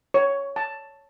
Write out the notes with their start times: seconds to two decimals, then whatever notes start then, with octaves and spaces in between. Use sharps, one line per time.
0.14 C#5
0.56 A5